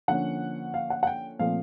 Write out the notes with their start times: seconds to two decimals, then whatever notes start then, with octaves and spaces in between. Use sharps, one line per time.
0.08 D3 F3 A#3 C#4 F#5
0.74 F5
0.90 F#5
1.03 F#5
1.07 G5
1.39 A#2 F3 A3 C4 F5